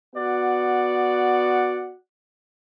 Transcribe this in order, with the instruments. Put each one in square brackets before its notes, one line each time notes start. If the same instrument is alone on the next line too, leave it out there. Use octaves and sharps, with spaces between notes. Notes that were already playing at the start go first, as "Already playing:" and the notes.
[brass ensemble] B3 F#4 D5 F#5